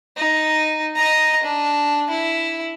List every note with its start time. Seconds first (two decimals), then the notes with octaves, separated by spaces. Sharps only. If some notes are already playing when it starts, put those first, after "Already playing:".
0.17 D#4
0.96 D#5 A#5
1.43 D4
2.10 E4